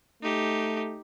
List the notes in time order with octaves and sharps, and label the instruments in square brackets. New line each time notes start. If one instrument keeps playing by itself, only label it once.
[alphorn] A3 [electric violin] D#4 G4